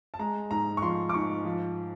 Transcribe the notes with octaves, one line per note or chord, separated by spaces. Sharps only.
A5
G#3 A#5
G#2 A#5
C#6
F3 C6
D6
G#2 C#6
F3